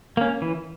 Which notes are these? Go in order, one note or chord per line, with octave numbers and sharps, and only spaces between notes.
A#3 C#4
E3